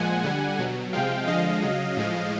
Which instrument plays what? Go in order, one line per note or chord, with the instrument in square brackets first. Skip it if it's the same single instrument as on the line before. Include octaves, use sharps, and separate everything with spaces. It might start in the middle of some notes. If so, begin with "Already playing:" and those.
Already playing: [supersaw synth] A#2 F3 G#3 F#5 G#5
D3 G3
B2 F#3
C3 F3 G#3 F5 G5
D3 F3 G#3 D#5 F5
C#3 F#3
A2 F3 G#3